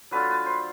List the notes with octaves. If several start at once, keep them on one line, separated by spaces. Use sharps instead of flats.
F#3 A3 D4 F4 B4
B4
C5